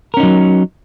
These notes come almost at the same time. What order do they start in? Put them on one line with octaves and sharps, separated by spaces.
A#4 C#4 D#4 F#3